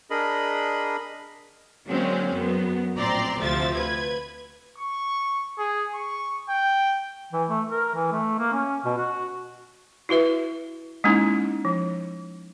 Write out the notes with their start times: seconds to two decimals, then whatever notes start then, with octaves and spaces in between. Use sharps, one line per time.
0.10 D4 G#4 A#4 D#5 B5
1.88 D3 F#3 G#3 A#3 C4 C#4
2.32 F#2 F#3 B3
2.96 A#1 A2 C4 D5 A#5 C6
3.39 D2 C3 F3 A3 E5 A6
3.74 B4 G#6
4.78 C#6
5.59 G#4
5.94 C#6
6.49 G5
7.33 E3
7.49 A3
7.69 A#4
7.95 E3
8.12 A3
8.39 A#3
8.53 C#4
8.85 B2
8.97 F#4
10.09 E4 F#4 B4 E5
11.04 G#3 A#3 C#4 D#4 E4
11.65 F3